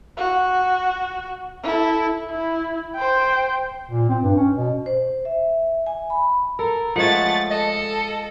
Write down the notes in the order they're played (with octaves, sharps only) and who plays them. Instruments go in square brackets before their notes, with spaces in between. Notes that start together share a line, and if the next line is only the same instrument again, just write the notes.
[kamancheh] F#4
E4 A4
E4
C5 G5
[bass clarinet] A#2
C4
G2
C#4
B2
[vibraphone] C5
E5
G#5
B5
[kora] A4 [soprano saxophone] A#4
[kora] F3 G#3 C#5 [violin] A3 A6 [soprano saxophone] F#5
[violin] A4 [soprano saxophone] D#5